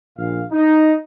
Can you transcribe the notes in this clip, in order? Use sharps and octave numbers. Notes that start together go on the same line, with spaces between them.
A#1 A#2 F5
D#4